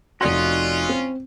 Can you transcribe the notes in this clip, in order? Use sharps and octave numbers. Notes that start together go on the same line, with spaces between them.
F1 C#4 D#4 F4 F#4 D5 C6
C4